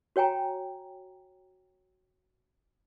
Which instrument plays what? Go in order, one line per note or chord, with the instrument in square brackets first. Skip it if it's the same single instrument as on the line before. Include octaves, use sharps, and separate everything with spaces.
[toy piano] F#4 C#5 G5 G#5 A#5